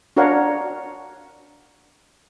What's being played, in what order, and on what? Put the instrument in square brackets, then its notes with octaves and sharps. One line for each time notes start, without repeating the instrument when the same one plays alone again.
[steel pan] D4 F#4 A#4 C#5 F5 F#5